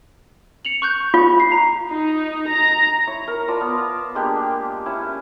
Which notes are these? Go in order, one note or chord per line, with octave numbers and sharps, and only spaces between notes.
C#7 F7 F#7
C#6 F#6 G6
F4
C7
A#5
D#4
A#5
E4 C#5
A#4
F4 D5 A5 B5
B3
G#3 A#3 D4 G4
C#4 E4